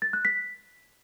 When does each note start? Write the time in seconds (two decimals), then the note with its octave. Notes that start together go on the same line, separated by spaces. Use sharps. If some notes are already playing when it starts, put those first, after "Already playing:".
0.02 A6
0.13 F#6
0.25 B6